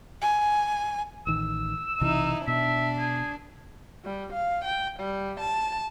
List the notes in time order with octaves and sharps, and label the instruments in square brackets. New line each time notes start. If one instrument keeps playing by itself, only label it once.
[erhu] G#5
[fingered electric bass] A1 D#3 [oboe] E6
[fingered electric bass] B1 C3 E3 [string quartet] D#4 E4
[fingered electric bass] B2 [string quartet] D4 [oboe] E5
[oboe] G#4
[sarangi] G3
F5
G5
G3
A5